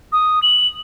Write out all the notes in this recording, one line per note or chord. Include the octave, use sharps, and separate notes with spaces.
D#6
F#7